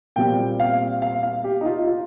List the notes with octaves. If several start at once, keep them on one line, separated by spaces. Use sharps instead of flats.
A#2 G3 C4 G5
F5
F5
F5
G4
D#4
F4
F4